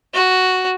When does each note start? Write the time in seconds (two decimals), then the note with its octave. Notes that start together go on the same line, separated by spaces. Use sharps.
0.14 F#4